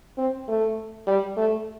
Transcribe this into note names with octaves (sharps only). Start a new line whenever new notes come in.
C4
A3
G3
A3